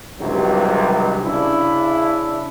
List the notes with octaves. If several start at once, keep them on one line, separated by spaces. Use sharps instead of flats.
C#2 G2 C3 D#3 E3 F#3
C#3 D4 E4